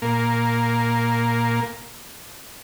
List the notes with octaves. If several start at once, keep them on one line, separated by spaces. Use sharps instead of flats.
A#2 A#3